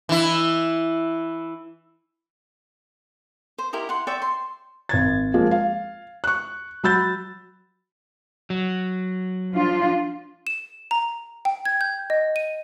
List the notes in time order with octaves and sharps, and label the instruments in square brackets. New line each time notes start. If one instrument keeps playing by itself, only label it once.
[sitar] E3 E4
[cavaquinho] C5
E4 G4 A#4 D#5
F#5 C6
C#5 D5 E5 G5
C6
[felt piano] G#1 G#6 A6
F3 G#3 A#3
F5
C#6 F#6
F#3 B5 E6 G6 A6
[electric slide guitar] F#3
[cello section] F3 D4 F4
[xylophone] E7
A#5
G5
G#6
G6
D#5
D#7